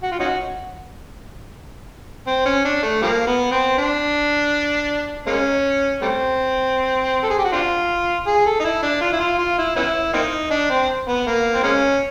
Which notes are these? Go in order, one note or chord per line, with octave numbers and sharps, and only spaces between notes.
F#4
F4
C#4 D#4 F#4
C4
C#4
D4
A3
F3 G3 A#3
B3
C4
D4
G#3 A#3 C#4
G3 A3 C4
A4
G#4
G4
F#4
C4 D4 F4
G#4
A4
D#4
E4
D4
F4
E4
F4
F4
E4
B3 C#4 E4
A#3 C4 D#4
D4
C4
B3
A#3
C4
G#3 A#3 C#4